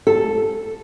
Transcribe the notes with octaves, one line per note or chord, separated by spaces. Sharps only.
A4